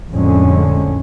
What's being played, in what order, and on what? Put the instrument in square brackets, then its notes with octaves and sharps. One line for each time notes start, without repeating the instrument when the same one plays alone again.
[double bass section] F2 A2 D3 G#3 C#4